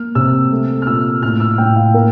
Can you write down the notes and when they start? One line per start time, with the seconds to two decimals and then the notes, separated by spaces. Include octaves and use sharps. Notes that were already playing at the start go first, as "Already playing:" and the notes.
Already playing: A#3 F6
0.15 C3 E6
0.51 A3
0.82 F6
0.87 A#2 E6
1.22 A2 F6
1.40 E6
1.58 A2 G5
1.76 F5
1.94 A#3 A#4